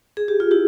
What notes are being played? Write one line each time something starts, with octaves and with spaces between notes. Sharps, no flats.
G#4
G4
F4
E4 G4